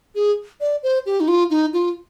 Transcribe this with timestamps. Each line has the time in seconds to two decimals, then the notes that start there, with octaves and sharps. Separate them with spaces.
0.15 G#4
0.60 D5
0.83 C5
1.06 G4
1.20 D#4
1.28 F4
1.50 D#4
1.73 F4